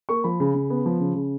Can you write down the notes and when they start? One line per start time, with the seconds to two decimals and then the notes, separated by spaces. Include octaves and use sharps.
0.09 A#3 C#6
0.24 F3 B5
0.40 C#3
0.55 C#3
0.70 B3
0.86 F3
1.00 C#3
1.15 C#3